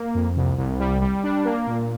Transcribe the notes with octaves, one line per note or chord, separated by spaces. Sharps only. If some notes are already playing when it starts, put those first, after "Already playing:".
Already playing: A#3
F2
C2
C2
G3
G3
D4
A#3
A#2